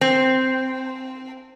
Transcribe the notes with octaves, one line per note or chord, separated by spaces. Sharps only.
C4